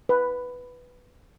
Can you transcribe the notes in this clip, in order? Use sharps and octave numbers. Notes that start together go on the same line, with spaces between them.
B4